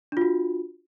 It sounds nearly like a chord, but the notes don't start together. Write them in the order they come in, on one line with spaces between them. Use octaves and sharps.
D4 F4 F#4